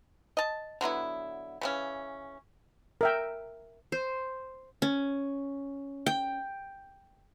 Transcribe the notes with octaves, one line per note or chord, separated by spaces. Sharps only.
D#5 A5
D3 F#3 B3 E4
C#3 E3 C#4
A#4 E5 G5
C5
C#4
G5